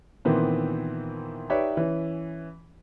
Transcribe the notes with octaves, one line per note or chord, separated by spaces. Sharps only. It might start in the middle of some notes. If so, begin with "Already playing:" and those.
A#2 D#3 E3 B3 C4
D#4 G4 B4 C#5 D5 E5
E3 C#4